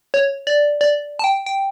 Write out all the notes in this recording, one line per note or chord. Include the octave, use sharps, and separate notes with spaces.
C#5
D5
D5
A5
G5
G5